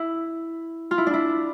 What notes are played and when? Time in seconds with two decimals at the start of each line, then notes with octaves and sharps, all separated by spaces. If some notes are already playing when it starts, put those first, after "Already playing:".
Already playing: E4
0.91 F4
0.98 E4
1.07 D4
1.14 E4